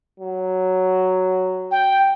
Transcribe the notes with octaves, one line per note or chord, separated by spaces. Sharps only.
F#3
G5